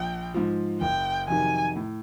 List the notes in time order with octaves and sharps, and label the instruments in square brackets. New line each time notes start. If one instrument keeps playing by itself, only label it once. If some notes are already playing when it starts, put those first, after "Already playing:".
Already playing: [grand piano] A#1 [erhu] G5
[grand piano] G#2 F3
[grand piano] F#1 [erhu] G5
[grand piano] F2 C3 D#3 F#3 [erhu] G#5
[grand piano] A2